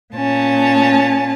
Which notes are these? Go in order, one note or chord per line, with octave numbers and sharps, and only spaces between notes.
A#2 C#4 A5